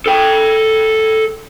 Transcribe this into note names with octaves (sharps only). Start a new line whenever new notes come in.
A4 G5